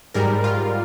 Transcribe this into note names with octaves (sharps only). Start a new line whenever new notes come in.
G#2 G3 A#4
F4